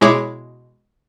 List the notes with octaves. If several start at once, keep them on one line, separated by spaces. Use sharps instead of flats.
B2 G#3 E4 G#4 C#5 D6